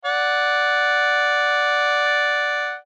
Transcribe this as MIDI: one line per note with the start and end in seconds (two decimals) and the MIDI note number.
0.05 2.75 74
0.05 2.75 78